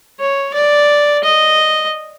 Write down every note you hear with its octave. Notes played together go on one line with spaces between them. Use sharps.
C#5
D5
D#5